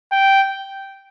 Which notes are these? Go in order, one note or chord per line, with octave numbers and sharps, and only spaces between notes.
G5